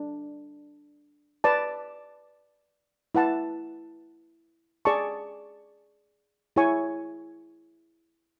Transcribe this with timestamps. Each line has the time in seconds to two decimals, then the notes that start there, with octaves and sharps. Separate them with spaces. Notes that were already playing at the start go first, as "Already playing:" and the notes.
Already playing: D4
1.44 B4 D5 A5
3.15 E4 B4 F#5 A5
4.85 G#4 D5 A5 C#6
6.56 E4 G#4 C#5 G#5 C#6